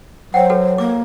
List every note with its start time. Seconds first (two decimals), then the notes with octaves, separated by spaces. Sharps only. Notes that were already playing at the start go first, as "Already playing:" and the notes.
0.34 F#3 C5 F#5 G5
0.50 F#4 A4 B4
0.78 A#3 D6